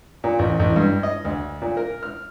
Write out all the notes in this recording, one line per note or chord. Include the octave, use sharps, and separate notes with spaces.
A#2
A1
A1
G2
D#5
D2
A#2
A#4
F6